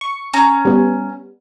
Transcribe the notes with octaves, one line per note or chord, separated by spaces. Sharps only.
C#6
C#4 A#5
G3 B3